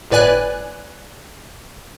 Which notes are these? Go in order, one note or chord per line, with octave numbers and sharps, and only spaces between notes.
G1 A2 B4 D5 G#5 F#6